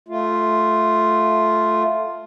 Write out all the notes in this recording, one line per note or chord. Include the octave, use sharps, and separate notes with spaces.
A3 F4